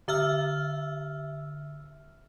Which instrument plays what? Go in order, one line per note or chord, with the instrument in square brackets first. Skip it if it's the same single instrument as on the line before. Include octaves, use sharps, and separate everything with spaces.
[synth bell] D3 E5 E6 F6